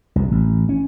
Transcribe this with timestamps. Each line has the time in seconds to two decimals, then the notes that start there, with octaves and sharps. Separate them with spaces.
0.16 C2
0.32 A1
0.69 C#4